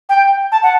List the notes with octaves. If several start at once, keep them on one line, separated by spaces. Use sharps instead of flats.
G5
A5
F#5